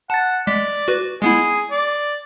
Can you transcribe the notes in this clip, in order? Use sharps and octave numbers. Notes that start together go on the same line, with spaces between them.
F#5 A5 A6
G#3 D5 B6
F#4 B4
G#3 B3 E4 G#4
D5